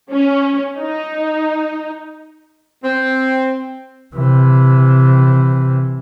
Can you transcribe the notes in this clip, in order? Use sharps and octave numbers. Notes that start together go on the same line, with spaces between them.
C#4
D#4
C4
C3 E3